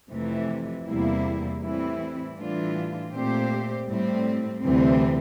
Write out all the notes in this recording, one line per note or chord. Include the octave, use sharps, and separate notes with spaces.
F2 C3 E3 A3
E2 C3 G3 A#3 E4
A2 E3 G3 C4 E4
A2 E3 G3 D4 F4
A#2 A3 C4 G4 C5
A2 G3 C4
D2 C3 E3 G3 C4